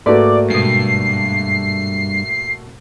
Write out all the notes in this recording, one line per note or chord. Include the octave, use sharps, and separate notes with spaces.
G#2 A3 A#3 F#4 B4 D5
G2 B2 G#3 C7